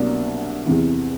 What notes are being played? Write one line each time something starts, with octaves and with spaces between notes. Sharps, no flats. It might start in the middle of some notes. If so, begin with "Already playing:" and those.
Already playing: C2 B2 F#3 A#3 D4
E2 C3 E3